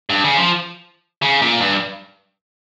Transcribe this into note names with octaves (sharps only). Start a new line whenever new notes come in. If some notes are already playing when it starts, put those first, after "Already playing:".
G2
C#3
F3
C#3
A#2
G2